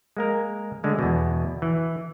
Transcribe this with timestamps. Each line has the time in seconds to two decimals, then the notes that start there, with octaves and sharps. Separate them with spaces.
0.17 G#3 A#3 A#4
0.83 D3 G#3 A3
0.99 E2 B2
1.62 E3